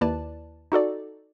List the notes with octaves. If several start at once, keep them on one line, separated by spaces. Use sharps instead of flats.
D#2 E4 B4 D5 A5
D#4 F#4 A4 D5